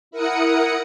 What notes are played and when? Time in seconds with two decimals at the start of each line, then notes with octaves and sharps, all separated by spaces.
0.11 E4 A#4 F#5 D#6 C#7